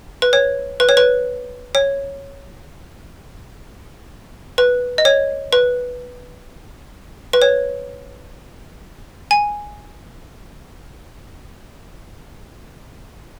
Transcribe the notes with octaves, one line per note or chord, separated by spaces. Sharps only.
B4
C#5
B4
C#5
B4
C#5
B4
D#5
C#5
B4
B4
C#5
G#5